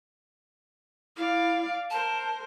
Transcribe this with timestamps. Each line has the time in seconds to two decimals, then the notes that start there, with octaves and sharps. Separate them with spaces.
1.16 E4 D5 F5
1.90 A#4 C5 A5